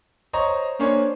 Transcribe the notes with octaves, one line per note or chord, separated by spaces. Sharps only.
C5 C#5 D#5 A#5 C#6
A#3 C#4 D4 C5 C#5